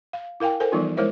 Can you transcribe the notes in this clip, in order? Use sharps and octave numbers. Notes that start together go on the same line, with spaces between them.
F5
E4 A#4 F5 G5 G#5
A4 A#4 C5 G#5
E3 F3 G3 B3 D#4 F4
G#3 E4 A#4 C5 C#5 E5